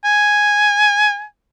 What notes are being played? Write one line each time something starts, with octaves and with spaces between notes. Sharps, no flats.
G#5